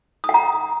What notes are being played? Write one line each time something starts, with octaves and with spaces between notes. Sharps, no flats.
D#6
F#5
A#5